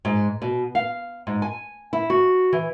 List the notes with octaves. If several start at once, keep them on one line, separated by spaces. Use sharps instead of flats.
G#2
B2
F5
G#2
G#5
E4
F#4
E3